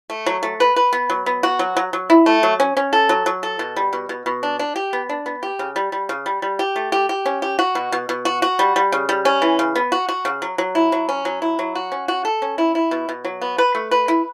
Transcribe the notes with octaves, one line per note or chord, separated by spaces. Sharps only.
A3
F#3
A3
B4
B4
B3
F#3
B3
F#4
F#3
F#3
F#3
E4
A3
F#3
C#4
C#4
A4
F#3
F#3
A4
B2
G3
B2
B2
B2
D4
D4
G4
B3
D4
B3
G4
C#3
G3
G3
C#3
G3
G3
G4
A3
G4
G4
C#4
G4
F#4
B2
B2
B2
F#4
F#4
G3
G3
C#3
G3
C#4
E3
C#3
B3
F#4
F#4
C#3
F#3
F#3
E4
F#3
C#4
F#3
E4
F#3
F#4
C#4
F#4
A4
C#4
E4
E4
B2
B2
F#3
B3
B4
A3
B4
E4